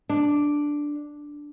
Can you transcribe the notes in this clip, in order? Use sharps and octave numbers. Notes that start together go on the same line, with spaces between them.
D4